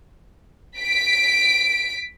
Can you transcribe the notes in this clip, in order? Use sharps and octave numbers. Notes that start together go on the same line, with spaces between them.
B6 D7